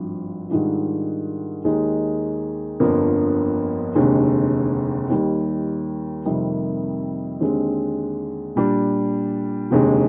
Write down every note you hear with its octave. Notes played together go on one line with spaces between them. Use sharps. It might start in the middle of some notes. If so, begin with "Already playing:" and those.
Already playing: G#1 G2 F3
G#2 D#3 G3 D4 F4
D#2 D#3 G#3 D#4
G1 F2 D3 F3 A#3
F1 D#2 D3 G#3
D#2 D#3 G3
F2 C3 D#3 G3 A#3
D#2 D3 G#3 C4
A#2 G3 D4
F1 D#2 D3 G#3